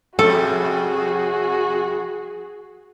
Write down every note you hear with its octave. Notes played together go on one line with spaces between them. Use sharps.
F2 C3 G3 F#4 G#4 A4